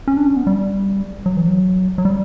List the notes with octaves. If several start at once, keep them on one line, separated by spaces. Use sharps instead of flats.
C#4
D4
C#4
B3
G3
F#3
E3
F#3
F#3
G3